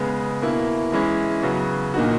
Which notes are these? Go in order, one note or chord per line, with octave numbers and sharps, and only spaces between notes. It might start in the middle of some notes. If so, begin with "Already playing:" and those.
Already playing: C#3 G#3 B3
B2 A#3 E4
E3 G#3 C#4 E4
C#3 F#3 B3 F#4
A#2 A#3 D#4 F#4